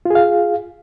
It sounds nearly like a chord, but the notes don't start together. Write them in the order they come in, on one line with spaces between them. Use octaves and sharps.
F4 G#4 F5